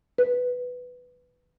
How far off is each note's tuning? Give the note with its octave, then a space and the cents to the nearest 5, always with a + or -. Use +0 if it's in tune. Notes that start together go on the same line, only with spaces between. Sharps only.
B4 +5